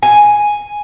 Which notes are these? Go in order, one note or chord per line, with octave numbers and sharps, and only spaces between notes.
G#5